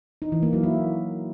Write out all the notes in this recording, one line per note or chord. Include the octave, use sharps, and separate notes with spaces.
D#4
E3
A#3
F#3
E4